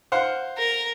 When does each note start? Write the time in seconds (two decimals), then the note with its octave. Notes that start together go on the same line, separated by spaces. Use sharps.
0.12 C5 F5 F#5
0.57 A#4